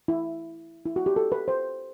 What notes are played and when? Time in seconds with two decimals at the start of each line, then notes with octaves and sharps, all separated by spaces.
0.08 E4
0.86 E4
0.96 F#4
1.06 G4
1.16 A4
1.32 B4
1.48 C5